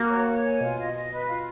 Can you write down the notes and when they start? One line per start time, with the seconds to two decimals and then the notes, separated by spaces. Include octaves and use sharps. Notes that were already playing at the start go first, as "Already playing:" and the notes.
Already playing: A#3 F#4
0.10 C#5
0.28 C#5
0.44 G#5
0.61 B2 F4
0.78 D#5
0.94 D#5
1.11 B4
1.28 F4